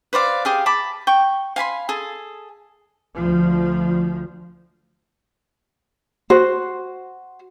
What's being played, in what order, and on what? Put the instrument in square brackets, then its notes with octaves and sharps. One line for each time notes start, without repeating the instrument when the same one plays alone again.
[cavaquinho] B4 C5 D5 F5
G4 G#4 F5
A5 B5 D6
G5 C#6
F5 G#5 B5 C6
G#4 A4
[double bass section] D2 F3
[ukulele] F#4 C5